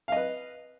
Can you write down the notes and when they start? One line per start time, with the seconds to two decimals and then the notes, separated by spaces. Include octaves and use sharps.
0.08 F5
0.12 D#5
0.16 B4